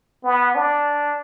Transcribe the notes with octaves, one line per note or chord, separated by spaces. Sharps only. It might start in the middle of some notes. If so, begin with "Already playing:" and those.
B3
D4